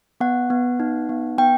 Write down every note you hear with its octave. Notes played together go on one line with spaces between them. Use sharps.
B3 F#5
B3
D#4
B3
B3 G5